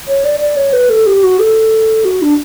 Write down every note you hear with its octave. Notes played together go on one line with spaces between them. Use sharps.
C#5
D5
D5
C#5
B4
A4
G4
F#4
A4
F#4
D4